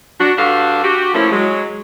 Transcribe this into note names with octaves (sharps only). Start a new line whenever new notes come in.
D4 F#4
G2 D4 F#4 G4 A4 F5
F#4 G4
F3 A3 A#3 C#4 E4
F#3 G#3